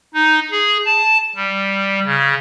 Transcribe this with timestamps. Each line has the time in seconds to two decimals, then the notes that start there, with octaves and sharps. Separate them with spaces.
0.14 D#4
0.51 G#4
0.85 A5
1.36 G3
2.05 C#3